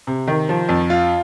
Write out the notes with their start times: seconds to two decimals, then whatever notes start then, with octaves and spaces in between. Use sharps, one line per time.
0.07 C3
0.27 D#3
0.49 F3
0.69 F2
0.90 F4